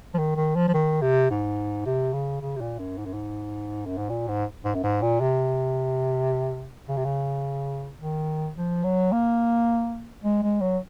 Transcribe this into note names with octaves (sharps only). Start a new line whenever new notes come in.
F3
D#3
D#3
F3
F3
D#3
C3
G#2
C3
C#3
C#3
C3
A#2
F#2
G#2
F#2
G#2
F#2
G#2
A#2
G#2
G#2
F#2
G#2
A#2
C3
C#3
C3
C#3
D#3
F3
F#3
A#3
G#3
G#3
F#3